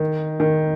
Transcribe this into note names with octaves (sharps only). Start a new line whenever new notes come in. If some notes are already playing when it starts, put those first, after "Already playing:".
Already playing: D#3
D#3